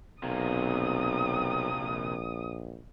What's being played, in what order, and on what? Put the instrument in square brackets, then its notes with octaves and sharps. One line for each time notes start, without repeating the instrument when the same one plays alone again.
[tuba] B1 [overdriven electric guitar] C3 A#3 [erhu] D#6
[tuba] A#1